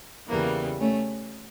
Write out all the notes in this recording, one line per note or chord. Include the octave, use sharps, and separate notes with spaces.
E2 C#3 E3 G3 A#3
A3 C#4